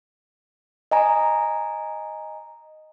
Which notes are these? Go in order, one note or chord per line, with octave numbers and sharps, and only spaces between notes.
D#5 G#5 A#5